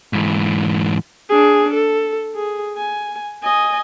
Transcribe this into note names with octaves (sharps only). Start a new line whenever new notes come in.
G#2 E3
D4 G#4
A4
G#4
G#5
D#5 G#5